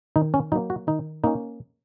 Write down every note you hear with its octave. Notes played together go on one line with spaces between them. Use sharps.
D#3 D#4
C#4
F#3 A#3 D#4
F#4
D#3 D#4
A#3 C#4 D#4